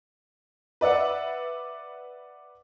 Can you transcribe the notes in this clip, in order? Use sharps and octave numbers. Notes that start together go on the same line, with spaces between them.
B4 D5 E5 F#5